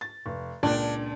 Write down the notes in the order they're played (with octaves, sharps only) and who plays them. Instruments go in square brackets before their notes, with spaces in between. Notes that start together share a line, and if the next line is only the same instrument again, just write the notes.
[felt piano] A6
F1
[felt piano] C#2 A#2 A5 [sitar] D4